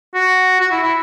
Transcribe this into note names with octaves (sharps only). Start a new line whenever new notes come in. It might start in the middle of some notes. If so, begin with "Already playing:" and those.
F#4
F#4
E4
E4